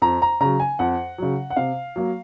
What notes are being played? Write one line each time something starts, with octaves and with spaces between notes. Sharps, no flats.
F2 A#5
A#5
C#3 F#3 A#5
G#5
F2 F#5
C#3 F#3
F#5
C3 F5
F#3 A#3